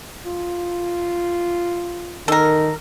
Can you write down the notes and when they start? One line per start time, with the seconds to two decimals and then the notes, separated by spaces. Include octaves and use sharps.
0.25 F4
2.28 D#3 A4 A#4